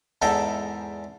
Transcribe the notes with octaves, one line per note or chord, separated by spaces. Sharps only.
E2 G#2 A4 E5 G5 A#5